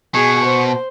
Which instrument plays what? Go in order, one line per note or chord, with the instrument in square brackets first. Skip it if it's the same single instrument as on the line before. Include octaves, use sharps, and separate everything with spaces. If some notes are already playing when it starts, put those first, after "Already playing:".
[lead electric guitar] B2 [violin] G#4 [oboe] C#6
[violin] C5